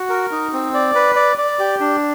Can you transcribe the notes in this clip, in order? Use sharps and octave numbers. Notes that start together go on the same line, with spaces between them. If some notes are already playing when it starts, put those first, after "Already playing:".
Already playing: F#4
A#4
D#4
C4
D5
B4
D5
D5
G4
D4